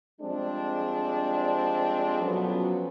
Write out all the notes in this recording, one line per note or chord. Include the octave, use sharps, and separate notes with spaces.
F3 G3 G#3 C4 D4
B2 F3 F#3 B3 C#4 A4